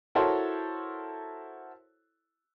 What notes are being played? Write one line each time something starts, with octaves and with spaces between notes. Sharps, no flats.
E4 F#4 A4 A#4 C5 C#5